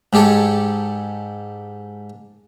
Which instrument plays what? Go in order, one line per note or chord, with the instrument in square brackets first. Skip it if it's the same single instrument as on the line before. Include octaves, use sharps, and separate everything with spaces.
[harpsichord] G#2 G#3 G4 A4 C#5